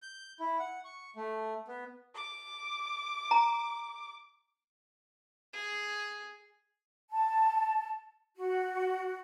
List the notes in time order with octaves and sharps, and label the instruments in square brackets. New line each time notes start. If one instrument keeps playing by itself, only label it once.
[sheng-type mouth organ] G6
E4
F#5
C#6
A3
B3
[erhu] D6
[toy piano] A#5
[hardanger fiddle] G#4
[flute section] A5
F#4